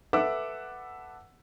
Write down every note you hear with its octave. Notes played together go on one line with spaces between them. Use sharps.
A4 B4 E5 F#5 D6 E6